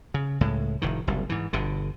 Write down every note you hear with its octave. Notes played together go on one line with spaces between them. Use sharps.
C#3
C#2 A2 G#3
F1 A2 D#3
F#1 C2
G#2 E3
G1 B2 D3